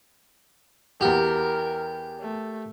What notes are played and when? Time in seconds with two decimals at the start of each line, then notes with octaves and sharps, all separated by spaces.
1.01 E2 F#4 G4 A#4
2.21 A3